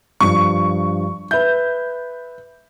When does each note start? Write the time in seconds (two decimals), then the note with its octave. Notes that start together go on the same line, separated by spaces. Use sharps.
0.21 G2 F3 C#6
1.31 B4 E5 G6